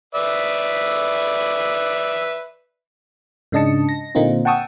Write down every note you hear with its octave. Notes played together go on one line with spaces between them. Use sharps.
B4 D5 E5
G#2 C#3 D4 D#5 A5 C#7
A#6
A#2 D3 A#3 C4 D#4 F4
F#5 G5 A5 C#6 D#6 E6